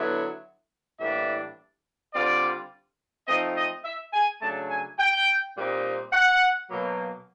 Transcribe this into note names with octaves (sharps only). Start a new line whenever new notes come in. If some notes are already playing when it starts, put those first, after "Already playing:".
Already playing: D3 F#3 B3 E4
A2 E3 G3 A#3 D4 E5
D3 G3 C4 F4 D5
F3 A3 C4 D#4 D#5
D#5
E5
G#5
C#3 F#3 A3 D4 A5
G#5
G5
A#2 G3 C4 D#4
F#5
B2 F#3 A#3